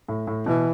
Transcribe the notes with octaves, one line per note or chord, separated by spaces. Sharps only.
A2
A2
B2 E3